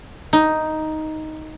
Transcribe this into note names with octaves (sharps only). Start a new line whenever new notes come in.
D#4